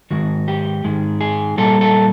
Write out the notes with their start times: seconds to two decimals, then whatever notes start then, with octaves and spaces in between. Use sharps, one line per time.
0.11 G#2 D#3 G#3 F#4
0.48 G4
0.84 G#2 D#3 G#3
1.21 G#4
1.57 A#2 G3 A#3 A4
1.81 A4